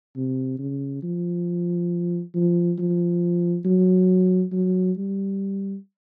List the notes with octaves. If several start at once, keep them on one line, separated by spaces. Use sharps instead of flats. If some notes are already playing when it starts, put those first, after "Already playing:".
C3
C#3
F3
F3
F3
F#3
F#3
G3